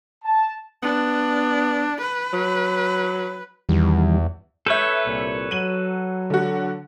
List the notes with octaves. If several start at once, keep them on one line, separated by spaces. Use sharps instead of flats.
A5
B3 D4
B4
F#3
E2 D#3 E3 G3
A4 B4 C#5 E5 G6
C2 A#2
F#3 D#7 F#7
D3 F#4